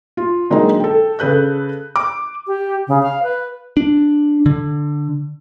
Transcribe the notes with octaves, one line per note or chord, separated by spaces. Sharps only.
F4
D3 F#3 G#3 A#3 C4 D#4
A4 G5
C#3 A4 B4 F#6 G6
D6
G4
C#3
F5
B4
D4
D3